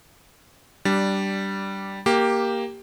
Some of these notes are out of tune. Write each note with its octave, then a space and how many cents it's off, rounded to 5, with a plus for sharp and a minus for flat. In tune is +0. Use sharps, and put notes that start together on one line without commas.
G3 -10 D4 +0
A#3 +0 G4 +5